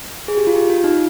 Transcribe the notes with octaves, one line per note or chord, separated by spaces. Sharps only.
G#4
G4
F4
G4
F4
D#4